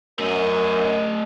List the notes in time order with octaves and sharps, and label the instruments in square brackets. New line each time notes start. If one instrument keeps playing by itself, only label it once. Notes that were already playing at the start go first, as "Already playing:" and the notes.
[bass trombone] F#2 [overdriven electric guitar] A3 D#5 [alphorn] A#4